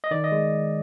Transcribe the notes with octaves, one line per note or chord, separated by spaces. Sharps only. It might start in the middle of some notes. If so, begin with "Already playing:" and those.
D#5
D#3 D5
D#5
G#3